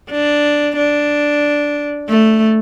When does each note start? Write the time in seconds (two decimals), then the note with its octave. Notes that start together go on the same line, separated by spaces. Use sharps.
0.11 D4
0.77 D4
2.09 A3